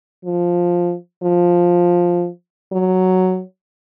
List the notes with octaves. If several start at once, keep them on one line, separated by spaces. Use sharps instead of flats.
F3
F3
F#3